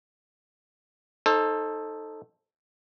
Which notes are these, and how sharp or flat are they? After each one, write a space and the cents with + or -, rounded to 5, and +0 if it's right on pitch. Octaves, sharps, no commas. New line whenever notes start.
D#4 +0 A4 +0 C5 +35